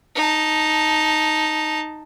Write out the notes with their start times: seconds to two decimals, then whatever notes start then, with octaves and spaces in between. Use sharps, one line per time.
0.15 D#4 A5